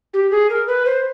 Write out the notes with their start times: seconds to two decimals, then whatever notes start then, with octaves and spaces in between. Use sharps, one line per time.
0.14 G4
0.31 G#4
0.50 A#4
0.67 B4
0.86 C5